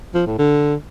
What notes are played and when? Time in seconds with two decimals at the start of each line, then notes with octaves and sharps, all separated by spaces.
0.14 F3
0.26 A2
0.38 D3